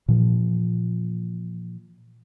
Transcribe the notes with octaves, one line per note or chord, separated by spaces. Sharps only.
A#2 E3 F3